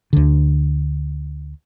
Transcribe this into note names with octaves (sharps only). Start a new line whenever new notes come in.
D2 D3